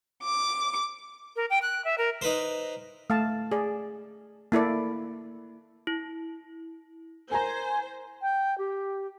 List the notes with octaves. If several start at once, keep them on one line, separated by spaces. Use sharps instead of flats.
D6
A#4
G5
F#6
E5
A#4
D#4 B4 C5
A3 F5 A5
G#4 D5
A#3 E4 A4 D5
E4
A#4 C5 G#5 A#5
G5
G4